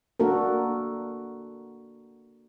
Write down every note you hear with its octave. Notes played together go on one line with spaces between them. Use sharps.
A#3 D4 F#4 A4 A#4